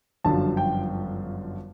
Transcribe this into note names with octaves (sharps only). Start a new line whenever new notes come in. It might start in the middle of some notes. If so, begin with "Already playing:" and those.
G1 F#2 D3 F3 A5
G5